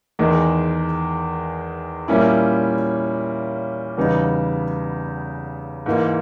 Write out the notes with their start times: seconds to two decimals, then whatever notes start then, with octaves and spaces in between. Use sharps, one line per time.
0.19 E2 D#3 G#3
2.08 A#2 G3 A#3 C#4 E4
3.97 E2 C#3 G3 B3 D#4
5.86 G#2 E3 A#3